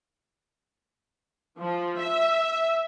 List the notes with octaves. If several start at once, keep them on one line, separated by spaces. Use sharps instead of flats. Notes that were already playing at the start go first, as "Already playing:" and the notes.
F3
E5